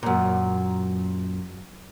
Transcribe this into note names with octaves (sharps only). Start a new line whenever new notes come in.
F#2 A#2